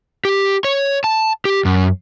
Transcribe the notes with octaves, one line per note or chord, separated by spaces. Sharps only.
G4
C#5
A5
G4
F#2